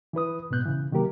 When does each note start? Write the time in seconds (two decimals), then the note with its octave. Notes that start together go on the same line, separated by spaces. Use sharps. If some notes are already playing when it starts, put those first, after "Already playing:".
0.13 E3 E4 B4 D#6
0.51 G#2 B2 B3 F#6 G6
0.65 C#3 E3
0.92 C3 D#3 F#3 A#3 G4 A#4